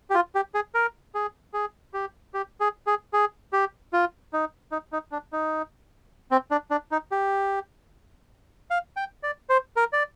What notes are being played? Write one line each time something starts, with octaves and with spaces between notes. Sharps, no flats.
G4
F4
G4
G#4
A#4
G#4
G#4
G4
G4
G#4
G#4
G#4
G4
F4
D#4
D#4
D#4
D4
D#4
C4
D4
D4
D#4
G4
F5
G5
D5
C5
A#4
D5